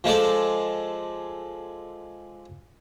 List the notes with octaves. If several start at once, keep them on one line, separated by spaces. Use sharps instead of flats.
F3 G#3 A4 D5